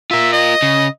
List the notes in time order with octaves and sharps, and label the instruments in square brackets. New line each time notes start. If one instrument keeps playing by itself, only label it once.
[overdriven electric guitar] F4 A#4 [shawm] E5
[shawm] D#5
[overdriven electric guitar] C#3